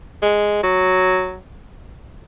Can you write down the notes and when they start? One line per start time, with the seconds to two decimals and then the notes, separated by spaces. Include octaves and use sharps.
0.22 G#3
0.63 F#3